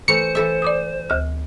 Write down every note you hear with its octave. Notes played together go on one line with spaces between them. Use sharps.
E3 A3 C5 A#5 C#7
E3 A4 E5
D5 D6 D#6
D2 F6